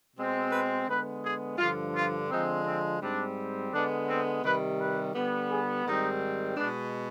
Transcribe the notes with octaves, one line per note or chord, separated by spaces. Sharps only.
B2 G#3 C4
B4
D3 G#3 B3 B4
G#4
G2 D3 F3 F4
F4
D3 F3 G#3 C4 D#4
C4
G#2 G3 C4 D4
D3 G#3 B3 D4
C4
C3 D#3 G3 B4
B4
D3 G3 B3
G#4
G#2 D#3 G3 C4 D#4
B2 G#3 B3 D4